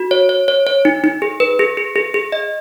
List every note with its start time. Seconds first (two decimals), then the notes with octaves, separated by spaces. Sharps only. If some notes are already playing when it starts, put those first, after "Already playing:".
Already playing: F#4
0.11 C#5
0.29 C#5
0.48 C#5
0.67 C#5
0.85 D#4
1.04 D#4
1.22 G#4
1.40 B4
1.59 G#4
1.77 G#4
1.96 G#4
2.14 G#4
2.32 D#5